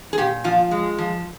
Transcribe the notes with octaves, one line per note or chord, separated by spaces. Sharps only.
G#4
A#2 G4
F3 F4
G#3
F3